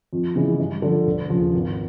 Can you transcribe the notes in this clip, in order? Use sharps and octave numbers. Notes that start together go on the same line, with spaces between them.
F2
C#3 E3 G#3 B3
G2
D3 F3
E1
D#2 C#3 F3
G#1